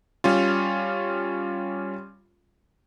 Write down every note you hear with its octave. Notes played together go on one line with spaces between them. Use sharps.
G3 C#4 F4